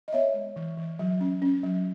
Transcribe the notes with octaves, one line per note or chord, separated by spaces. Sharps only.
D#5
B3 C#5 E5
G#3
E3
E3
F#3
C#4
C#4
F#3